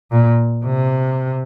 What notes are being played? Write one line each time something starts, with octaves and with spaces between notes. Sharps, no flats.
A#2
C3